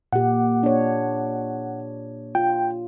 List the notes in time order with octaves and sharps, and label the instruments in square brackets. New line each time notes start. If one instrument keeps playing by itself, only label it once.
[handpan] A#2 G4 [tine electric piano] F#5
[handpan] D4 C#5
[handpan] F4 [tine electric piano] G5